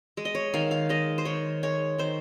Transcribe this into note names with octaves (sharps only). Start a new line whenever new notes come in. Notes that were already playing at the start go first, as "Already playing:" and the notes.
G#3
D#5
C#5
D#3 F5
F5
G#3 D#5
C5
D#3 C#5
G#3 C#5
D#3 C5